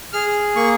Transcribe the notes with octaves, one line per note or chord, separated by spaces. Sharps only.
G#4 F6
A#3 C#6